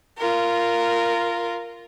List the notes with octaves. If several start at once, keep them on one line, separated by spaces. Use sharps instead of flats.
F4 A#4